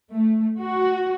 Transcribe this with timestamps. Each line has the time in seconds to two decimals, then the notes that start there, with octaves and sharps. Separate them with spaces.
0.12 A3
0.60 F#4